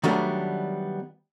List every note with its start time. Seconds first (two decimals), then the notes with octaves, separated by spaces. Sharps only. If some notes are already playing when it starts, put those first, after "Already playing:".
0.03 D#3 F#3 G3 A3 B3 D4